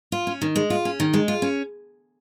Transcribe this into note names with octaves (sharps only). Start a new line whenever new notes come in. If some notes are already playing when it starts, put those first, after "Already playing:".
F4
C#4
D#3
G#3
F4
C#4
D#3
G#3
F4
C#4